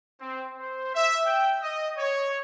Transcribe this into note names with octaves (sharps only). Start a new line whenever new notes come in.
C4
C5
E5
G5
D#5
C#5